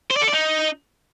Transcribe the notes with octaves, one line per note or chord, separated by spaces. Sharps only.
C5
D5
A4
D5
D#4